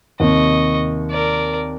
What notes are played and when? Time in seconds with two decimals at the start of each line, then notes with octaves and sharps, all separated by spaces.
0.20 D#2 C3 D#5 C#6
1.10 A#4 D5